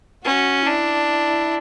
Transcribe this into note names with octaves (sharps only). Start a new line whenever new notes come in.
C#4 F#4
D4 E4